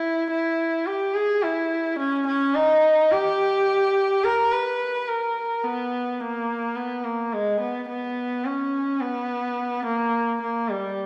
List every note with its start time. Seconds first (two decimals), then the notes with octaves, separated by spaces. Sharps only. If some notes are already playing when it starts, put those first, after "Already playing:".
Already playing: E4
0.31 E4
0.86 G4
1.14 G#4
1.43 E4
1.99 C#4
2.27 C#4
2.55 D#4
3.11 G4
4.23 A#4
4.52 B4
5.08 A#4
5.64 B3
6.20 A#3
6.76 B3
7.04 A#3
7.33 G#3
7.60 B3
7.89 B3
8.45 C#4
9.01 B3
9.85 A#3
10.41 A#3
10.70 G3